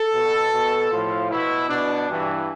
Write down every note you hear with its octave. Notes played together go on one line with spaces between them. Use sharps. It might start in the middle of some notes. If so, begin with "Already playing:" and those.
Already playing: A4
B2
B2
A2 F3 F4
B2 E4
B2 D4
G2 E3